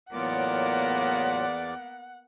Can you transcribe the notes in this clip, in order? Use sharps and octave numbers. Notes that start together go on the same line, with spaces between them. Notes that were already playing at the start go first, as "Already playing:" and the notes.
E2 A2 F#3 A#3 B3 F4 D5 F#5